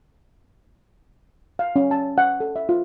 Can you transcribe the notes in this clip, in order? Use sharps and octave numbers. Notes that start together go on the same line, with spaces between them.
F5
C#4
A5
F#5
A4
E5
F4